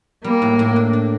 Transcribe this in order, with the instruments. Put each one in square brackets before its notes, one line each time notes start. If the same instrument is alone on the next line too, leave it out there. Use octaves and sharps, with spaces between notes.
[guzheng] G3 [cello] A#3
[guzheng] A2
A2
D4
D4